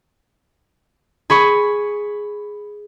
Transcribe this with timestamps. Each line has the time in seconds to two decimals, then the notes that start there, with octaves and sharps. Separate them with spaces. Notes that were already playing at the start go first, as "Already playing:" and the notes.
1.30 G#4 B5 C#6